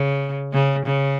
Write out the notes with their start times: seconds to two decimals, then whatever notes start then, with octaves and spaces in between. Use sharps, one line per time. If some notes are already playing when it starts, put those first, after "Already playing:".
Already playing: C#3
0.53 C#3
0.86 C#3